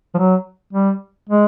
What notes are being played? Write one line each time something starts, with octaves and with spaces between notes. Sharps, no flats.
F3
F#3
G3
G#3